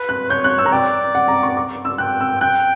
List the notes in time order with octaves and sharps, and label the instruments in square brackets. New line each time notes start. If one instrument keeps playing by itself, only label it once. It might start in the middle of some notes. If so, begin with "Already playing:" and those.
Already playing: [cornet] B4
[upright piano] F#6
[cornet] C#5 [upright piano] G6
[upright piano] F#6
E6
A#5
[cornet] D5 [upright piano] G5
[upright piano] F#5
A#5
C#6
D6
E6
[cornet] G5 [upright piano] F#6
[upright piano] E6
[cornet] G5 [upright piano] F#6